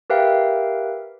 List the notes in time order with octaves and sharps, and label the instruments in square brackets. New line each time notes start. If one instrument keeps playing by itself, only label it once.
[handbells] G4 A#4 B4 E5 F5 G5